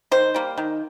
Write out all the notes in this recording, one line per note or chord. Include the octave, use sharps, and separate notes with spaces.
D#3 C5
G3 A#3
D#3